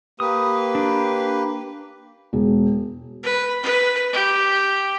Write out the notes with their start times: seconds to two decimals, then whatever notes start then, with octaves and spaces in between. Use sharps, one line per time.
0.20 A#3 G4 B4 D#6
0.75 D4
2.33 E1
3.23 B4
3.63 B4
4.13 G4